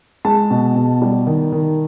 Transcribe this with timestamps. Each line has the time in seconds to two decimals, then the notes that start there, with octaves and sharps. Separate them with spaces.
0.25 G#3 A5
0.51 B2
0.76 B2
1.02 G3
1.27 D#3
1.52 D#3